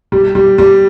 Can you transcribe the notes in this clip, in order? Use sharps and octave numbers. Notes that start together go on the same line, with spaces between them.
G3
G3
G3